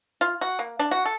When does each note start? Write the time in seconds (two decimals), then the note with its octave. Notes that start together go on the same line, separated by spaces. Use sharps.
0.21 F4
0.41 F#4
0.59 A#3
0.79 D4
0.91 F#4
1.06 A4